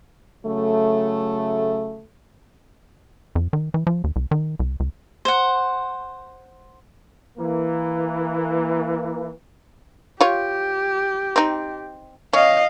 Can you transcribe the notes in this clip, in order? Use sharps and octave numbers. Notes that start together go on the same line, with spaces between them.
C#3 F#3 A3
F2
D#3
E3
F3
D#2
C2
D#3
C2
C#2
C5 F#5
E3 A#3
F4 G4 C#5
C4 D#4
C#4 D#5 F5